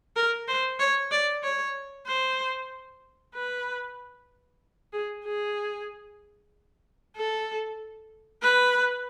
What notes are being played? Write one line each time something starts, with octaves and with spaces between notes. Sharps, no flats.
A#4
C5
C#5
D5
C#5
C5
B4
G#4
G#4
A4
B4